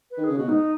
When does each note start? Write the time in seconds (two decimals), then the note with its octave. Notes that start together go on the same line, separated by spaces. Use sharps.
0.11 B4
0.18 D#3
0.24 G#4
0.29 C#3
0.37 B2 F#4
0.49 G#2 D#4